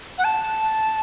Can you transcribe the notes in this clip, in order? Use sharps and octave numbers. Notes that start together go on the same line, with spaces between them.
F#5
A5